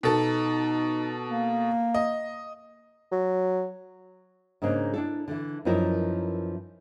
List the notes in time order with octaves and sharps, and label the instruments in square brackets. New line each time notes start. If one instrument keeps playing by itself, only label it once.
[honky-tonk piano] B2 A4 [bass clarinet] D#4
[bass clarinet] A#3
[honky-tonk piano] D#5
[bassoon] F#3
[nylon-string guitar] G#2 C#3 A#3 D4 D#4
D4 E4 A4
D3 E3
F#2 E3 F3 D#4 E4 A#4